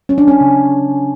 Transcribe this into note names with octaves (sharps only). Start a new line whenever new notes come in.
F#3 C#4
D4
C#4
C#3